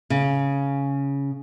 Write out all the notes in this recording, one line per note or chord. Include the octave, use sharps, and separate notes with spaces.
C#3